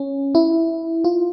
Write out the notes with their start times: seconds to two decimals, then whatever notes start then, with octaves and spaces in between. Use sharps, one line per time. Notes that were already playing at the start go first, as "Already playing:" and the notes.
Already playing: C#4
0.35 E4
1.04 F4